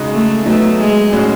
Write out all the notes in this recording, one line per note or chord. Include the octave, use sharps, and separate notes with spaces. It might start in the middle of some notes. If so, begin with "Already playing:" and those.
Already playing: C#3 G#3 D#4 F#4
A3
F#3 A3 B3 D#4
G#3
A2 G#3 C#4 F#4